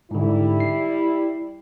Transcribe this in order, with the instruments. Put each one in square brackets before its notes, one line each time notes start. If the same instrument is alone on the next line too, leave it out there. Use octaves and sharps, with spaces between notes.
[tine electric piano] G#2 D3 [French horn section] G3 E4
[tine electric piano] C7